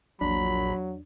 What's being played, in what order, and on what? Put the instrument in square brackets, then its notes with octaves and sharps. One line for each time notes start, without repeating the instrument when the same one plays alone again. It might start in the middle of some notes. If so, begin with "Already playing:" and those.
[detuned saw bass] A#1 [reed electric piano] E2 D4 [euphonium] F#3 [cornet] B5